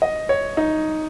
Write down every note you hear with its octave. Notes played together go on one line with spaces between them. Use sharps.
D#5
C#5
D#4